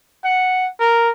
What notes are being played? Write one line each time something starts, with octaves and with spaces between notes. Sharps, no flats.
F#5
A#4